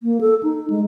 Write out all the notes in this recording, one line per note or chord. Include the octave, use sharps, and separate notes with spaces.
A#3
A4
D#4
G#3